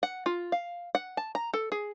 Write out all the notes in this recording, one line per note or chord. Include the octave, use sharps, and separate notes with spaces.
F#5
F4
F5
F#5
A5
A#5
A4
G#4